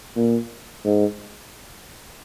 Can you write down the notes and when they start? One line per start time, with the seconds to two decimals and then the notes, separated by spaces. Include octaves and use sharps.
0.17 A#2
0.85 G#2